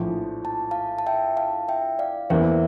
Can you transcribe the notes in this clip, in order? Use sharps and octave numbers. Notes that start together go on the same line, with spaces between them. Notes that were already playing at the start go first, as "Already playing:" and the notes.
Already playing: A#1 A2 F3
A5
F5 A5
A5
E5 G5
F5 A5
E5 G5
D5 F5
E2 E3 A#3 C5 E5